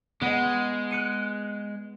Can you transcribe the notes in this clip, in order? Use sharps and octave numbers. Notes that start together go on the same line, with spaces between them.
G#3 B3 D#5
F#6 C#7 D#7